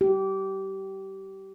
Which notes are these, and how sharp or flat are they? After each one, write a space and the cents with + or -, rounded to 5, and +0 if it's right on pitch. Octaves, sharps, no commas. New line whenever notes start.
G4 -25